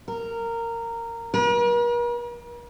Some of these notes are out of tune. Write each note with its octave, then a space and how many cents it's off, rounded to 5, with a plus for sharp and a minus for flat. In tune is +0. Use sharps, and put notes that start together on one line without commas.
A#4 -15
A#4 +45